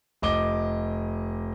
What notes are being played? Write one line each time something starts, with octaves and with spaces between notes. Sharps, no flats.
F1 D#5 D6 G7